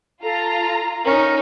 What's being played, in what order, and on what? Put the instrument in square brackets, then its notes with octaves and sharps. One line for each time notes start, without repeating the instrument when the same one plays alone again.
[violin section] F4 A#5 [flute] A4
[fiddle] C#4 D#4 [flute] A#4